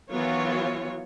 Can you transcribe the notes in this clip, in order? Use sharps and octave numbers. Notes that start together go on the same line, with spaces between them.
D#3 E3 F#3 B3 F4 C#5